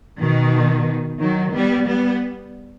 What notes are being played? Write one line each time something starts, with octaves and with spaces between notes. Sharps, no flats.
B2 D#3
D#3 F#3
G3 B3
G3 B3